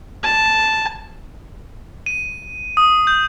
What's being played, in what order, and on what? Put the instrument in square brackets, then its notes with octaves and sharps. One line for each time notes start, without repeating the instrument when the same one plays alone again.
[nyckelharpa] A5
[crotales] D#7
D#6
G6